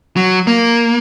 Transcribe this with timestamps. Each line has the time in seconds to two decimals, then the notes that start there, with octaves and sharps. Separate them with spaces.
0.16 F#3
0.47 A#3